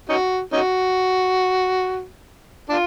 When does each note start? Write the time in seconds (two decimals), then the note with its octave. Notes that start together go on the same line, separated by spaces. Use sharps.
0.09 C#4 D#4 F#4
0.53 C#4 D#4 F#4
2.69 D4 F4